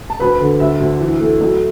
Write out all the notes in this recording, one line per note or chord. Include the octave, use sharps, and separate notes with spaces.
A5
D2 B4 B5
D3
D2 E5
D2
E3
A3
B1